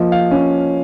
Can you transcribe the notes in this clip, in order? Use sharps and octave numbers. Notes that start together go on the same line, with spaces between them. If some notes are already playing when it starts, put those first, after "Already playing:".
Already playing: F3 A#3 D#5
F5
C#4